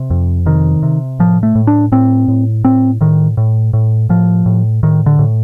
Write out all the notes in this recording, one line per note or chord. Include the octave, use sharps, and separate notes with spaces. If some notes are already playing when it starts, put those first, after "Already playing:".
Already playing: C3
F2
C3 D#3
C3
A2 F3
A3
A2
D4
A2 C4
A2
A2 C4
A2 D#3
A2
A2
A2 F3
A2
A2 D#3
D3
A2